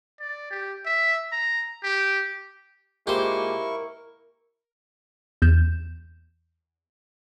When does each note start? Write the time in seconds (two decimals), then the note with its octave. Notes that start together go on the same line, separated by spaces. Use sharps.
0.20 D5
0.51 G4
0.86 E5
1.32 A#5
1.84 G4
3.07 A#2 G#3 A#3 E4 G4 A#4 C5 C#6
5.42 E2 G6 E7